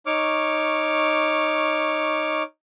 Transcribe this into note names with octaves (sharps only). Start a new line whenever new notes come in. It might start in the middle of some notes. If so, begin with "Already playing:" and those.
D#4 C#5 C#6 D6 F6